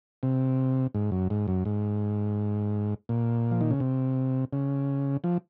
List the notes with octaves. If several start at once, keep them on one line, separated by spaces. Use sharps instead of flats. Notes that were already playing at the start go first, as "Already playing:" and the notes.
C3
G#2
F#2
G#2
F#2
G#2
A#2
F3
D#3
C#3
C3
C#3
F3